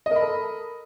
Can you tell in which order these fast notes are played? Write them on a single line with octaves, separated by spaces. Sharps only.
D#5 A#4 B5 A4